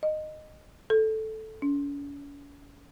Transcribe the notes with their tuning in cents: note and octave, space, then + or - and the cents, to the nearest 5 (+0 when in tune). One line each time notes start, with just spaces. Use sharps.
D#5 -15
A4 -5
C#4 +40